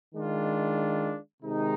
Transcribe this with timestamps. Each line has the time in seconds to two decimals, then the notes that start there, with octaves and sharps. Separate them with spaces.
0.15 D#3 G#3 D4 F4
1.43 C3 D#3 G#3 D#4